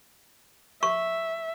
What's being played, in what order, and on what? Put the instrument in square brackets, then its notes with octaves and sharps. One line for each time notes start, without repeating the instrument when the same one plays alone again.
[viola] E5 [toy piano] C#6